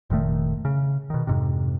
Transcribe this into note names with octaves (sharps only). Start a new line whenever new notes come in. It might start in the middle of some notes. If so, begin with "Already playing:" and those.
F1 A#2 D#3 A3
C#3
B2 D#3
F2 G#2 C3